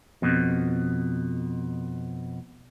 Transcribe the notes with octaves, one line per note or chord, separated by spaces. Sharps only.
F2 B2